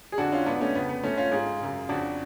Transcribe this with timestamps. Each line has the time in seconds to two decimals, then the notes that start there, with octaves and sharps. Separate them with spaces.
0.12 G#4
0.18 F2 D3 D4 F#4
0.32 C#4 F4
0.46 G#2 B3 D4
0.61 A3 C#4
0.75 F2 C#3 B3
0.89 B3
1.03 G#2 A3 C#4
1.17 C#4 F4
1.32 G#2 F4 G#4
1.61 F#2 C#3
1.89 F2 C#3 D4 F#4